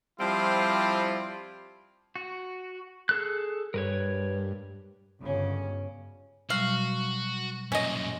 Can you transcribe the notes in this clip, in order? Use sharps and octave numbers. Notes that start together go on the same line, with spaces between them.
F3 G3 C4 E4 F4
F#4
G#4 A4 F#6
G2 A#4 B4 C#5
G1 G2 C#3 C#4
B2 F#3 G3 F#4 F5
F#2 A#2 C#4 D#5